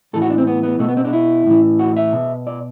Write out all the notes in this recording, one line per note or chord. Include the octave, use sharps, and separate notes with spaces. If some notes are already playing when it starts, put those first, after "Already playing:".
A2 E3 A4
F#4
D4
C4
B3
B3
B2 A3
B3
C4
D4
E4
A2 E3
F#4
E5
B2
D5